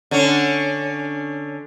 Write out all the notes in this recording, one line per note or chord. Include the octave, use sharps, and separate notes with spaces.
D3 C#4